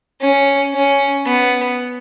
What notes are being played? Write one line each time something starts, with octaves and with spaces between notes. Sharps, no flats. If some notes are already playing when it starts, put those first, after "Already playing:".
C#4
C#4
B3